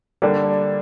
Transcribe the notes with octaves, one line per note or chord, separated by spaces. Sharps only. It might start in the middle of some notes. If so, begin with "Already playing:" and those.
D3 G3 A#3 D4 A4